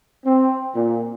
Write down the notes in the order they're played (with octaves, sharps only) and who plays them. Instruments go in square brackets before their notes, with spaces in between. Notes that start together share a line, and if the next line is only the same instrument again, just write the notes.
[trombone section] C4
A#2